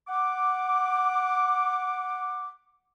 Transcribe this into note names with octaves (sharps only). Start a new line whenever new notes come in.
F#5 D6